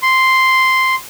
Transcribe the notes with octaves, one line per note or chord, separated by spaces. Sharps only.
C6